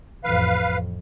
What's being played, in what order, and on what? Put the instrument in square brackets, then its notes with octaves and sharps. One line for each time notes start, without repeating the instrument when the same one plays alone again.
[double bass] A1 F2 [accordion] B4 F5